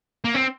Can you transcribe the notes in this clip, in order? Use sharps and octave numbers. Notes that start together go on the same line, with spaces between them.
A#3
C4